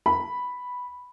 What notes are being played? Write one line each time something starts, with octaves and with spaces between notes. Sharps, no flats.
B5